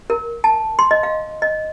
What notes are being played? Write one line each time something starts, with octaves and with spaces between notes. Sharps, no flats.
A#4
A5
C6
D#5
F5
D#5